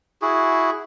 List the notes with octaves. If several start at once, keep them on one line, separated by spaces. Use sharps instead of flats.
E4 F#4 G#4